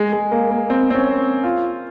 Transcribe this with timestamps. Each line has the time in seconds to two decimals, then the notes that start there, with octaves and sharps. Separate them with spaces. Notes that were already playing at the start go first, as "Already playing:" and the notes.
Already playing: G#3
0.13 G#3
0.32 A#3
0.51 A#3
0.70 C4
0.90 C4
0.94 C#4
1.44 F4